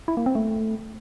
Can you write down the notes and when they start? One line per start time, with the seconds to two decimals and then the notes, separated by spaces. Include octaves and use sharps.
0.08 E4
0.17 A#3
0.26 C4
0.35 A3